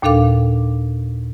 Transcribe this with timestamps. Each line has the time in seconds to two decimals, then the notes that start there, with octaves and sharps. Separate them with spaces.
0.02 D#2 A#2 D4 A4 F5 D6